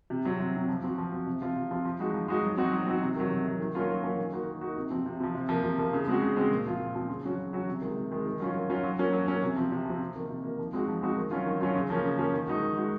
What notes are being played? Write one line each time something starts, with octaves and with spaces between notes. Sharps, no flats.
C3
F#3 C4
C3
F#3 C4
F3
C4 F#4
F3
C4 F#4
C3
F3 C4 F4
C3
F3 C4 F4
F3
G#3 D#4 F#4
F3
G#3 D#4 F#4
F#3
C4 D#4 F#4
F#3
C4 D#4 F#4
C3
D#3 F#3
C3
D#3 F#3
D#3
F#3 A#3 C#4 F4
D#3
F#3 A#3 C#4 F4
D#3
A#3 D#4 F#4
D#3
A#3 D#4 F#4
C3
F3 C4
C3
F3 C4
C3
F3 A#3
C3
F3 A#3
C#3
G#3 C4 F#4
C#3
G#3 C4 F#4
A#2
F3 C4 F4
A#2
F3 C4 F4
C#3
F#3 C#4 F#4
C#3
F#3 C#4 F#4
C3
D#3 G#3
C3
D#3 G#3
D#3
F#3 C#4 F4
D#3
F#3 C#4 F4
F#3
A#3 C#4
F#3
A#3 C#4
C3
F3 C4
C3
F3 C4
C3
D#3 A#3
C3
D#3 A#3
F3
G#3 C4 D#4 F#4
F3
G#3 C4 D#4 F#4
D#3
F#3 C#4 F4
D#3
F#3 C#4 F4
C#3
F3 A#3 C#4
C#3
F3 A#3 C#4
D#3
G#3 D#4 F#4
D#3
G#3 D#4 F#4